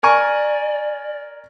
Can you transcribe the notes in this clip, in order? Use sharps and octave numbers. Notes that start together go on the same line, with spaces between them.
A#4 D5 G#5 C#6